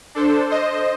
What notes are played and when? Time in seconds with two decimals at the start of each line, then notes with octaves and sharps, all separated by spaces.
0.15 D4 A4 C5
0.50 C5 D#5